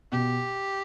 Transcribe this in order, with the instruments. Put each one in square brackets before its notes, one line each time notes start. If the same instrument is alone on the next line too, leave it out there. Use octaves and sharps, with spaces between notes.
[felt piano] B2 [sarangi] G4